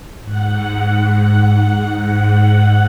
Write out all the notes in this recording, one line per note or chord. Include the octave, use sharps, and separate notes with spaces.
G#2 F#5